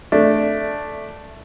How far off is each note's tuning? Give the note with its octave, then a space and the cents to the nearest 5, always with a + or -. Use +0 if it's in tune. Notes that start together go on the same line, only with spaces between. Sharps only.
A3 +0 D4 +0